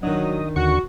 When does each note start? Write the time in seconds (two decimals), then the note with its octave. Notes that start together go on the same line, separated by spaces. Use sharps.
0.03 D#3 F#3 D4 D#5
0.56 D#2 D3 F#4 C#6